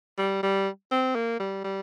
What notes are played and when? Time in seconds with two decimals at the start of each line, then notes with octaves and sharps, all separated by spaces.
0.18 G3
0.43 G3
0.91 C4
1.15 A#3
1.40 G3
1.64 G3